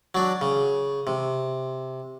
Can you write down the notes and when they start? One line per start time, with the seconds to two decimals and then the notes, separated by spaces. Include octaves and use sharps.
0.15 F#3 D4
0.41 C#3
1.07 C3